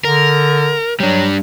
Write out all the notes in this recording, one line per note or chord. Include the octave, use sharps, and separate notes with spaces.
D3 A#4
F#3 G3 D4